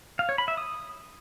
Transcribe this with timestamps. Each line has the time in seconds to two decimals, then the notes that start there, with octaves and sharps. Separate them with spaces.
0.19 F5
0.29 C#5
0.38 B5
0.48 E5
0.57 D#6